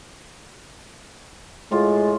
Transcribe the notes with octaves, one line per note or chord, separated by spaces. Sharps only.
A2 G#3 F4